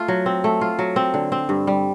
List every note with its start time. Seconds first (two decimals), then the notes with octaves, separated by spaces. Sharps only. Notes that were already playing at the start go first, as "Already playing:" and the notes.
Already playing: A3 F4
0.08 F#3
0.26 C4
0.44 A3
0.61 F4
0.79 F#3
0.96 C4
1.14 D3
1.32 C4
1.49 G2
1.67 G3